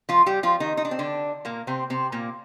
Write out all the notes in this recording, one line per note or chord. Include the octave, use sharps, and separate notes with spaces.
F3 F4
G3 G4
F3 F4
D#3 D#4
D#4
D4
C4
D3 D4
A#2 A#3
C3 C4
C3 C4
A#2 A#3